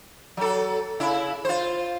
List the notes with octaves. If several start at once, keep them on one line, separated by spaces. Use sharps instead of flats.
F#3 A4
C#3 E4
F4 C5